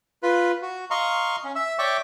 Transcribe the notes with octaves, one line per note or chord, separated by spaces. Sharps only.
F4 B4
F#4
D#5 F5 A#5 C6 C#6
C#4
E5 E6
C#5 D5 E5 G5 C#6 D6